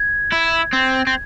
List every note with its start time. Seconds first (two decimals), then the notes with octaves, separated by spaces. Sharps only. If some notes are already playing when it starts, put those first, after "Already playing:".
Already playing: G#6
0.33 E4
0.73 C4
1.07 C4